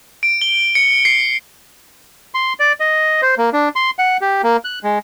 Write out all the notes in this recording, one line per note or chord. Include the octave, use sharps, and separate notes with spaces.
D7
G7
C#7
C7
C6
D5
D#5
C5
A#3
D4
C6
F#5
G4
A#3
F#6
G#3